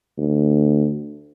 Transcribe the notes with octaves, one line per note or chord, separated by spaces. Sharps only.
D2